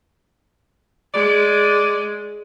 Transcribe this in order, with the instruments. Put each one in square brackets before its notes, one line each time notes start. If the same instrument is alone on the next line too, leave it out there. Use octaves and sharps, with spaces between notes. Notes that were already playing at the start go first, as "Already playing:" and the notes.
[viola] G#3 [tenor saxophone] D5